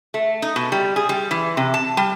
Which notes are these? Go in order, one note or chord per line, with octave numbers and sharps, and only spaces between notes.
A3
D#4
B2
G3
G#4
G3
E3
C3
A5
G3